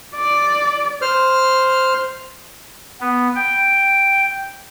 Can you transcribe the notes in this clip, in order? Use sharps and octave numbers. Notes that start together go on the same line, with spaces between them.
D5
C5 F6
B3
G5